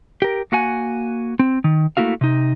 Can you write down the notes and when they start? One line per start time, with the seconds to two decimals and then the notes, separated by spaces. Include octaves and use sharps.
0.22 G4 A#4
0.52 A#3 F#4 F#5 G#5
1.39 C4
1.64 D#3
1.97 A3 A#3 E4 F#4 F5
2.21 C3 D#4